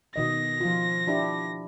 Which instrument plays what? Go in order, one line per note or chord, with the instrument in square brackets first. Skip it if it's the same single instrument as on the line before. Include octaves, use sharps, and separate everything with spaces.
[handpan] B2 D#3 D#5 [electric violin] A#6
[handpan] F3 F4
D4 E4 G4